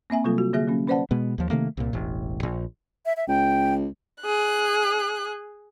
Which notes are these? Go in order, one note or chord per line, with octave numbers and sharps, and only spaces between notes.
A#3 C4 E5 G#5
C3 F#3 G3 A#3 F4 A4
F#4
D3 A#3 G#4 E5 F6 A#6
F#3 A#3 C#4
C#4 B4 C5 D5 F#5 A5
B2 G#3 B3
D#2 F3
C3 D#3 A3 A#3
C2 A#2
E1 A1
A#1
E5
E5
C#2 G5
G#4 F#6